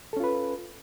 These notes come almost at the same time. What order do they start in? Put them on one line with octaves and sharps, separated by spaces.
A4 C#4 F4 B4